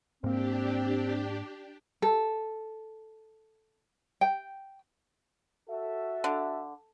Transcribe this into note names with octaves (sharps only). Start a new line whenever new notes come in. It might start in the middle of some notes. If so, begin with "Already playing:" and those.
G#2 A#3 C4 D4 G4
A4
G5
F#4 A4 E5
D3